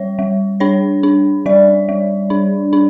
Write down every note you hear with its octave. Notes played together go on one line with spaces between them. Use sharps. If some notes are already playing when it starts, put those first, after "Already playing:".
Already playing: G3 C#5
G3
D4 C#5
D4
G3 D5
G3
D4
D4